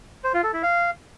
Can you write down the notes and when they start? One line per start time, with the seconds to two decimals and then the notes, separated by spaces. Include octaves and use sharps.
0.24 C5
0.34 F4
0.43 A4
0.53 E4
0.63 F5